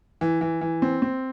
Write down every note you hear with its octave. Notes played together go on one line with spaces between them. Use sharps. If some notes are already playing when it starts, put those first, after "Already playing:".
E3
E3
E3
C4
C4